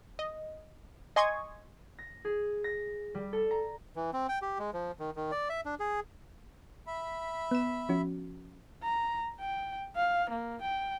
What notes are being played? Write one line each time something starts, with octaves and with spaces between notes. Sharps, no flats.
D#5
D#5 G#5 C6 C#6 D#6 G#6
A#6
G#4
A#6
G3
A4
A#5
E3
C4
G5
G4
G#3
F3
D#3
D#3
D5
E5
D4
G#4
E5 B5
B3 E7
F3 C#4 F#4
A#5
G5
F5
A#3
G5